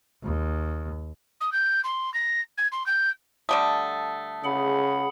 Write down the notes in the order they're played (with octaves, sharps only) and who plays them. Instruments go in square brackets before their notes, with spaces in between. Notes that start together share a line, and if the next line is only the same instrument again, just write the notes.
[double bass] D#2
[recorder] D#6
G6
C6
A#6
G#6
C6
G6
[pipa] D3 G3 A3 [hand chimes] A5 D#6
[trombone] C#3 [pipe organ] G#4 F#5 B5